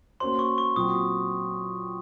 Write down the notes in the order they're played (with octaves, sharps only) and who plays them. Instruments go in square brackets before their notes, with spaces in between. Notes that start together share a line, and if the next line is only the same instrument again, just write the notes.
[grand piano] A#3 C#4 F#4 C5 [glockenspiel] C6
[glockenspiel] C#6
C#6
[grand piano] A#2 F#3 C4 [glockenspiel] D#6